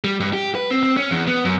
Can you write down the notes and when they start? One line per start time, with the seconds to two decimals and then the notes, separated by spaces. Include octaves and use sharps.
0.04 G3
0.20 G2
0.33 G4
0.55 B4
0.71 C4
0.83 C4
0.97 C#4
1.11 E2
1.27 B3
1.45 F#2